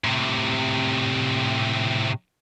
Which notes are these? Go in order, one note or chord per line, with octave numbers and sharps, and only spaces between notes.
A2 C3